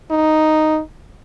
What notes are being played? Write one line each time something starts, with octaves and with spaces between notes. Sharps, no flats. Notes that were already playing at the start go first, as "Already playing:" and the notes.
D#4